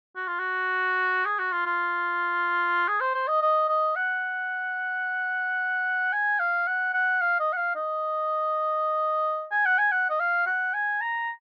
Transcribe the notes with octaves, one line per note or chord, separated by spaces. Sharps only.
F#4
F4
F#4
G#4
F#4
F4
F4
G#4
C5
C5
D#5
D#5
D#5
F#5
G#5
F5
F#5
F#5
F5
D#5
F#5
F5
D#5
G#5
F#5
G#5
F#5
D#5
F5
F#5
G#5
A#5